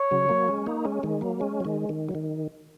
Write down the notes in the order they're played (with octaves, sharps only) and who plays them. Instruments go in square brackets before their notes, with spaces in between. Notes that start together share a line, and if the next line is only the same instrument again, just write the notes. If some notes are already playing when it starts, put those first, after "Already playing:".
Already playing: [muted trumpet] C#5
[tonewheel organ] C#3 F#3
F#3 A#3
G#3 C#4
A#3 D#4
G#3 C#4
D#3 G#3
F#3 A#3
G#3 C#4
F#3
D#3 G#3
D#3
F#3
D#3